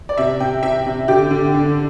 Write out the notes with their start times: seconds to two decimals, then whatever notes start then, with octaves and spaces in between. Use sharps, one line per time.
0.09 D5
0.17 C3 E5
0.40 C3 G5
0.63 C3 E5
0.86 C3
1.08 D3 G4
1.31 D3
1.54 D3